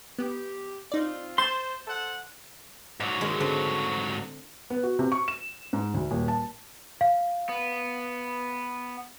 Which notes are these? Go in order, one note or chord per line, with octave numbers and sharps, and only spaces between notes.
B3 G4
C4 D#4 F4 D5
C5 C6 G6 A6 E7
A4 C5 F#5
G#2 F#3 D5
D#3 G#3
D3 A3 C4
B3
F#4
C3
C#6
E7
G#2
D2
D#1
A5
F5
B3